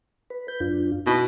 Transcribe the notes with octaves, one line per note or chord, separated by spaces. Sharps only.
B4
B4 G6
F#2 D4 F4
B2 D#4 E4